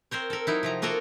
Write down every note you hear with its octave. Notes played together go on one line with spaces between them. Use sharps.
C4 A#4 C5 C#5
A4 A#4
F#3 D#4 E4
C3 F3 A#5
A#3 F4 F#4 A4 A#4